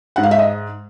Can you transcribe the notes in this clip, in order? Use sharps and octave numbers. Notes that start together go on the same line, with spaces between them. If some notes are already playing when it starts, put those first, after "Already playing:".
G#2 F#5
F5
E5
D#5